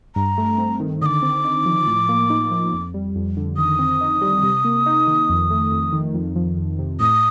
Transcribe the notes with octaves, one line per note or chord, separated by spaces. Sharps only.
G2 A#5
A3
C4
D#3
D3 D6 D#6
C4
D#4
F3
A2
A#3
D#4
F3
F2
G3
F2
D3
D#3 D#6
C4
D#4
G3
C3
A#3
D#4
D#3
F2
A3
F2
D#3
F2
F3
F2
C3
A2 D#6